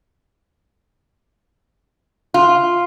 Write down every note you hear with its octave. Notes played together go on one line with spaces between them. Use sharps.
F4